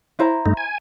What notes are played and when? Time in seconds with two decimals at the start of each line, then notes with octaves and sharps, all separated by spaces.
0.19 E4 C5 A#5
0.46 G2 A3 D#4
0.57 G#5